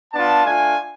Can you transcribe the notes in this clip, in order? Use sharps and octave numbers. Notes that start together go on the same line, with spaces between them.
B3 D4 F4 A5
A3 D4 F4 G#5